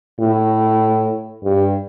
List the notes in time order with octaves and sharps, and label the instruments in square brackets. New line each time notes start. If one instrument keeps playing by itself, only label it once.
[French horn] A2
G2